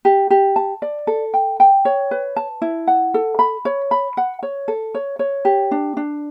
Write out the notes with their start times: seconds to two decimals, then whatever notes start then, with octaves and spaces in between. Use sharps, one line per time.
0.05 G4
0.30 G4
0.56 A5
0.82 D5
1.07 A4
1.34 G5
1.60 G5
1.85 C#5
2.11 B4
2.36 A5
2.62 E4
2.87 F#5
3.14 A4
3.39 B5
3.65 C#5
3.91 B5
4.17 F#5
4.43 C#5
4.68 A4
4.95 C#5
5.19 C#5
5.45 G4
5.71 D4
5.97 D4